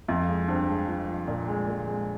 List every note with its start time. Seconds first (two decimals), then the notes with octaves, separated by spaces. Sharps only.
0.08 F2 F3
0.28 G#3
0.48 G2 C4
0.69 G#3
0.88 F3
1.08 F3
1.27 A#2
1.48 G#3
1.67 A#2
1.87 G#3